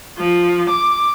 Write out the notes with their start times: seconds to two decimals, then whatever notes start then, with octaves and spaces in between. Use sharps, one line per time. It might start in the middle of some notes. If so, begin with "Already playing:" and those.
0.19 F3
0.69 D6